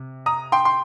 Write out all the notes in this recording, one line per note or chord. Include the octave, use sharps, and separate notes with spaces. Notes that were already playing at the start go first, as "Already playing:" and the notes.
Already playing: C3
A#5 D#6
G5 C6
C6